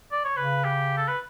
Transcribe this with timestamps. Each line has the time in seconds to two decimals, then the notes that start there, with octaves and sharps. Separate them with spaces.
0.12 D5
0.25 C#5
0.37 C#3 B4
0.64 G4
0.97 A4
1.08 B4